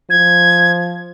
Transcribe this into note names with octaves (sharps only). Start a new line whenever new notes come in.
F3 G#6